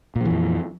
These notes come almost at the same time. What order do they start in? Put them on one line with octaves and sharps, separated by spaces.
A#2 F3 E3 F2